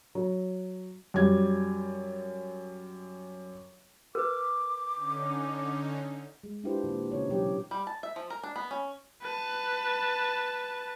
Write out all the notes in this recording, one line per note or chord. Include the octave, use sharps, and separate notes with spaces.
F#3
F#2 G3 G#6
A#4 B4 D6
D3 C#4 D#4
G#3
D4 E4 F4 G4 B4 C5
A#2 D#3
C#3 D#4 C#5
B2 E3 F#3 G4
G3
A5
E5
F3
A#4
D4
B3
C#4
B4 A5